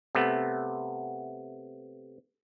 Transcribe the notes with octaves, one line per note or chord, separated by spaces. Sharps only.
C3 A3 B3